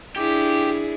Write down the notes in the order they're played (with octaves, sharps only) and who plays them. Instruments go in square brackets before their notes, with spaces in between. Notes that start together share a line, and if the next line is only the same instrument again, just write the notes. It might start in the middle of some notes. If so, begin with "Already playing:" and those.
[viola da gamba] D4 E4 G#4 [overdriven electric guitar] G4